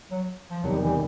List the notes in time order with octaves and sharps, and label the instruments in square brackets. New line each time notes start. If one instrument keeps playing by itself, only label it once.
[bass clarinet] F#3
F3
[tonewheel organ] E2 C3 D#3 G3 [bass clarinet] F#3
[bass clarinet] E3